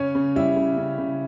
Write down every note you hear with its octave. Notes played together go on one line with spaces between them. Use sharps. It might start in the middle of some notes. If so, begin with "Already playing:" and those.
Already playing: C#3 C#4 C#5
C#3
G3 E4 E5
C#3
C#3
C#3